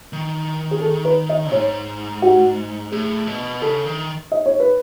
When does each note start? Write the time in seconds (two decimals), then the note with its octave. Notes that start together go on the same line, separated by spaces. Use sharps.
0.13 D#3
0.71 G#4
0.81 A4
1.05 B4
1.29 D#5
1.52 G#2 C#5
2.22 F#4
2.92 A2 G#4
3.27 B2
3.62 C#3 A4
3.85 D#3
4.32 D#5
4.46 C#5
4.60 B4